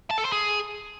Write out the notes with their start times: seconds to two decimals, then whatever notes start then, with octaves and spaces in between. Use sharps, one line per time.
0.11 A5
0.18 A4
0.25 C5
0.32 G#4